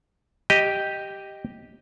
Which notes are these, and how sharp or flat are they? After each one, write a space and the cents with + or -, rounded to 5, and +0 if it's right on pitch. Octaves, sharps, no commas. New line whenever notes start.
G4 +0 D#5 +0